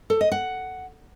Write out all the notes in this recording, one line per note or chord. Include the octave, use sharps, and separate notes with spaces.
A4
D#5
F#5